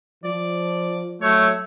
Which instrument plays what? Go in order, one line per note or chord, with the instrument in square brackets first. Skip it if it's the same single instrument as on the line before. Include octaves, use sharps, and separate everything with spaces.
[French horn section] F3 [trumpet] D5
[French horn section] F#3 [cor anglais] A3 [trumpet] C#5